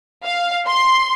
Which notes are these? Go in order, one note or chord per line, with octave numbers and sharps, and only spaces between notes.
F5
C6